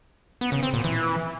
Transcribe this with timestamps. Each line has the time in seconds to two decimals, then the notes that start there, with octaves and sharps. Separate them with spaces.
0.41 B3
0.52 C#3
0.63 C4
0.73 A#2
0.84 E3